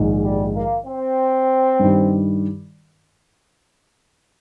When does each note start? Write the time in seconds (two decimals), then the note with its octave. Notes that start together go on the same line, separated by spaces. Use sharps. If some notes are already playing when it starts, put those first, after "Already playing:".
Already playing: A#1 G#2 D#3
0.24 G3
0.55 A#3
0.87 C4
1.80 G2 D#3 G3